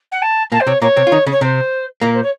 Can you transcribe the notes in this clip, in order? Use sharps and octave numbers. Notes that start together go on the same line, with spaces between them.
F#5
A5
A#2 A#3 A5
C5
C3 C4 C#5
A#2 A#3 C#5
C3 C4
F4
D#3 D#4
C#3 C#4
C#5
C3 C4 C5
A#2 A#3 A#4
C5
C#5